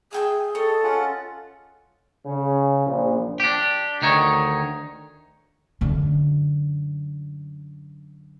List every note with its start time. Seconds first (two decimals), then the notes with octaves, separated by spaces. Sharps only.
0.13 G#4 E5 G5 G#5
0.55 A4 C#5 D#5
0.83 C#4 F4 F#5
2.26 C#3
2.86 A#1
3.40 D4 G4
4.02 D2 D#3 D#4 C#5
5.81 F#2 D3